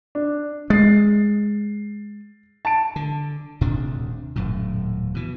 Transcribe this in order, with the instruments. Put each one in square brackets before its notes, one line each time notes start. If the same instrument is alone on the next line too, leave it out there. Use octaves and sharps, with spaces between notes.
[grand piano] D4
[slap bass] G#3 [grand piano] A6 C7
[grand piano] A5 D7
[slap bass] D3
D#1 D2 C3 D4
D#1 F#2 A2
B2 E3